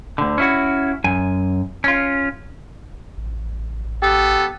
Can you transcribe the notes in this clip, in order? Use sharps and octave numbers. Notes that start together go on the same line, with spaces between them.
D2 D3
C#4 E4 F#4
F#2 G#5
C#4 F4
A1
B3 G4 A4